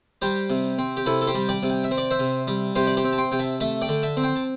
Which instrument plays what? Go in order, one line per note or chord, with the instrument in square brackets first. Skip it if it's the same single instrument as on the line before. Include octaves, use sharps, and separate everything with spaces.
[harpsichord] G3 G4 C5
C3
C4
G4
C3 E4 A4
A4
G4 C5
G3
D5 G5
C3
G5
E5
C4
D5
C5 E5
C3
G3
C3 G4 C5
D5
G4 C5
C4
A5
G5 C6
C3 G5
E5 A5
A3 E5 A5
D5 G5
D3
E5 A5
C4
G5 C6
A5